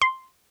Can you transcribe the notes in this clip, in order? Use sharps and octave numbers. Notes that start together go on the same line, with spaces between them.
C6